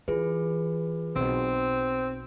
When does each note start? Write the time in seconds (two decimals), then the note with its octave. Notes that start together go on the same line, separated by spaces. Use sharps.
0.08 E3 F4 G#4 B4
1.16 B1 C4